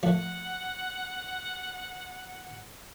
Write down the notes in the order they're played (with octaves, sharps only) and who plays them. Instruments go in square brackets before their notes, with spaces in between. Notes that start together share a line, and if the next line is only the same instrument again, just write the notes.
[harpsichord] F3 A3 [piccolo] F#5